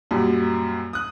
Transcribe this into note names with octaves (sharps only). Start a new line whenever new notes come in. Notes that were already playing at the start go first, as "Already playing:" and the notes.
F#2 A#2 F#3 G3
D#6 F#6